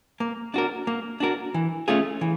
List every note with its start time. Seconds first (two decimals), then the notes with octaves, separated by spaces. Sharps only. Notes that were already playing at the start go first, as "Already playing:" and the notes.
0.20 A#3
0.54 D4 F#4 A#4
0.87 A#3
1.20 D4 F#4 A#4
1.54 E3
1.88 A3 C#4 F4 G#4
2.21 E3